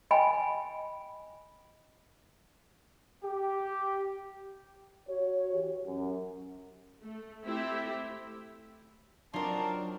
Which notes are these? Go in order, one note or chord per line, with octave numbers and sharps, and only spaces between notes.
D#5 G5 G#5 B5
G4
F#4 C#5
E3 G4
F#2
A3
A3 C4 E4 G4 E5
F#3 C4 D4 D#4 F4 A#4 A5